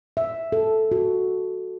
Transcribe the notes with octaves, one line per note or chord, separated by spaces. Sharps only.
E5
A4
F#4